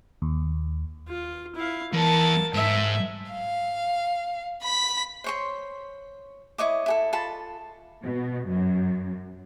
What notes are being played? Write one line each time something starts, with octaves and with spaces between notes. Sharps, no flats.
D#2
F4
E4 F5
E2 E4 A#4 A5
G#2 E5
F5
B5 B6
C5 C#5 C6
E4 C#5 D#5 D6
E4 G#4 A4
F4 A4 A5 B5
B2
F#2